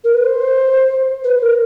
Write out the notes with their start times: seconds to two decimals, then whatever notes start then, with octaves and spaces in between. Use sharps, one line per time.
0.04 A#4
0.14 B4
0.24 C5
1.24 B4
1.41 A#4